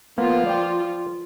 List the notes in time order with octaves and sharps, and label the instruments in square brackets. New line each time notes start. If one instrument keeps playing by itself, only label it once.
[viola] F3 F4 [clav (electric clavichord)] A#3 B3
[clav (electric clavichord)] D5 G5